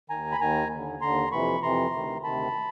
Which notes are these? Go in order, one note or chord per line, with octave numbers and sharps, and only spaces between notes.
D#2 D#3 G#5 A#5
B5
D#2 D#3 G#5 A#5
D#2 D3
D#2 D3 A#5 C6
F2 C3 E3 B5 C#6
F2 C3 E3 A#5 C6
D2 C3 D#3
D2 C3 D#3 A5 B5